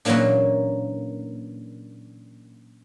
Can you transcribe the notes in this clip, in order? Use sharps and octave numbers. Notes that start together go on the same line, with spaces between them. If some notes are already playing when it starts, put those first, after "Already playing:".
A#2 C#3 E3 F#3 A#3 D4